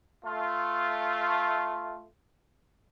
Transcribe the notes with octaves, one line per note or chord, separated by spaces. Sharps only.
A3 F4